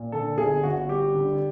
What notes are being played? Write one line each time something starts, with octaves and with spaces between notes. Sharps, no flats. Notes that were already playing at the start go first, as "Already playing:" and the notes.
Already playing: A#2
D3 A4
G1 G#4
G1 F#4
G3 G4
D3